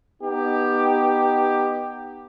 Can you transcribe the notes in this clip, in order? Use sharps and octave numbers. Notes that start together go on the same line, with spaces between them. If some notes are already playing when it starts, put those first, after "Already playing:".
B3 D#4 G4